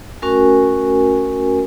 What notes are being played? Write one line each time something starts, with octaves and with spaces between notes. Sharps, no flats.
A3 C#4 F#4 A#4 G#5